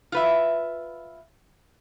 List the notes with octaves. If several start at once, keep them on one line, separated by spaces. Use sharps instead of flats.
F4 B4 E5